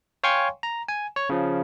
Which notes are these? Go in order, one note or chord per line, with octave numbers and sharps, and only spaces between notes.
C#5 F5 G5 G#5 C6 C#6
A#5
G#5
C#5
C#3 F3